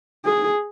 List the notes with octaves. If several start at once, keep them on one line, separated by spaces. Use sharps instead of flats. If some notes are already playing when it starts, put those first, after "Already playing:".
G#4